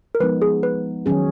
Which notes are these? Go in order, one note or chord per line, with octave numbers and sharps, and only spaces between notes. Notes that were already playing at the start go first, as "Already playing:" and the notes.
A#4
F3 G#3 B3 D#4 B4
G#4
B4
D#3 F#3 C#4 G#4